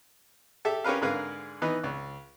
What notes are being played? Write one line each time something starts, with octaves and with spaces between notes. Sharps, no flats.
G4 A4 E5
C#4 G4 A#4 B4 F5
G#2 D3 G#4 A#4 B4 F5
E3 B3 D#4
C#2